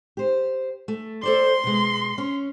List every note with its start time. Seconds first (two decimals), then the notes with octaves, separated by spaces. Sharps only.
0.17 G4 C5
0.88 A3
1.23 A4 C5 D5 C6
1.63 B2 G#3
2.18 C#4